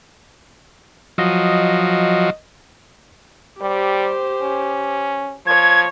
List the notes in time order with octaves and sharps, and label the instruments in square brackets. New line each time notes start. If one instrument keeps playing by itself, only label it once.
[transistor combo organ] F3 F#3 [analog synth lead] D#5
[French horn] G3 [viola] G4 C5
[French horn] C#4
[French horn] F3 [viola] C#5 [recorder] G#6